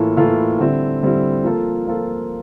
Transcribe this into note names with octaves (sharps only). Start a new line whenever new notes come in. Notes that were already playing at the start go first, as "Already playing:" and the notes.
Already playing: A2 E3 A#3 F4 A4
A2 E3 A#3 F4 A4
D3 G3 C4 E4
D3 G3 C4 E4
F3 A#3 F4 A4
F3 A#3 F4 A4